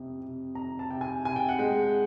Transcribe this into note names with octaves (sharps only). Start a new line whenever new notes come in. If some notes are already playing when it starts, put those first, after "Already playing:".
Already playing: F2 C3
C3
F2 A#5
A5
C3 G5
G#5
C3 G#5
G5
F#5
G#3 G5